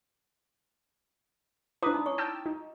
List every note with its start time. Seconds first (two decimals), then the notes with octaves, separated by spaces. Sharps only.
1.82 D4 E4 B4 D6 D#6
1.94 D#4
2.06 C#4 C#6
2.18 G5 A5 E6
2.46 D#4